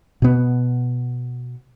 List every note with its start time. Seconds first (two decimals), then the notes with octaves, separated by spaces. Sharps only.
0.22 B2 B3